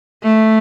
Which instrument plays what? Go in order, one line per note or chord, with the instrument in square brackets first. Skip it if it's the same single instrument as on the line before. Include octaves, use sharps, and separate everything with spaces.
[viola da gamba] A3